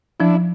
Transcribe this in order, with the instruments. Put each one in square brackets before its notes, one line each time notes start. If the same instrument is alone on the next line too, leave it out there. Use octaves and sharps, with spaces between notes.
[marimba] F3 [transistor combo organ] D4 E4